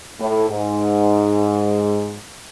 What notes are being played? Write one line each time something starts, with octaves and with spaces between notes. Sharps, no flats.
A2
G#2